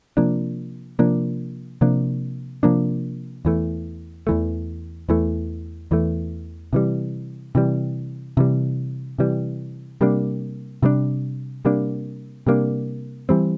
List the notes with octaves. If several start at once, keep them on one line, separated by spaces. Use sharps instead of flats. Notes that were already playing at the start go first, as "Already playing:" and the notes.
C3 F3 A#3 D4
C3 F3 A#3 D4
C3 F3 A#3 D4
C3 F3 A#3 D4
E2 E3 A3
E2 E3 A3
E2 E3 A3
E2 E3 A3
C3 E3 G3
C3 E3 G3
C3 E3 G3
C3 E3 G3
C3 G3 A#3 D4
C3 G3 A#3 D4
C3 G3 A#3 D4
C3 G3 A#3 D4
E3 G3 C4